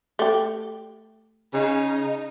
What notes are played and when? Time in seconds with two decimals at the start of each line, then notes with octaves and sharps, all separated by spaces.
0.19 A3 G4
1.53 C#3 D#4